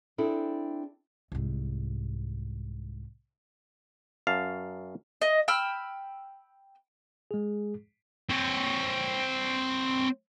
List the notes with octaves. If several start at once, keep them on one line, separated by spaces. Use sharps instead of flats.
C4 D4 E4 G#4 A4
C2 G#2
F#2 F5 A5
D#5
G5 B5 E6 F6
G#3 G#4
C4 C#5